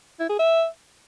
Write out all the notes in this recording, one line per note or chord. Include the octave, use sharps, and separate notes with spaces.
E4
G#4
E5